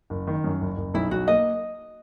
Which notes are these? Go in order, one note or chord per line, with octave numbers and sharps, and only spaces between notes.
F#1
D#3
F#2
F#1
F#1
B1 E4
B1 F#4
A#3 D#5